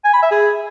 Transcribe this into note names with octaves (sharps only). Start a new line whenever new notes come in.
G#5
B5
E5
G#4